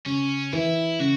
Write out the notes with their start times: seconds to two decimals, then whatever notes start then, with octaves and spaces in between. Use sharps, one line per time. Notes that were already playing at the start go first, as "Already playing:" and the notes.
0.06 C#3 C#4
0.53 E3 E4
0.99 C#3 F#4